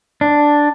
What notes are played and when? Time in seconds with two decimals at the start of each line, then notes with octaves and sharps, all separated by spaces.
0.21 D4